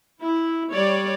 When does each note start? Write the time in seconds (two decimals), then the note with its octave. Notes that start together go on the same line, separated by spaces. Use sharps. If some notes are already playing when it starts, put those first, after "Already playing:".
0.21 E4
0.72 G3 C#5 D5